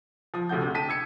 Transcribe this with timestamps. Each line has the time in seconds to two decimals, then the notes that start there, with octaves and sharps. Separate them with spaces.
0.34 F3 D#6
0.49 D2 C3 A3 F#4 G6
0.62 D2 C3
0.74 G5 A5 B6 D#7
0.89 E6 G#6 C#7 D#7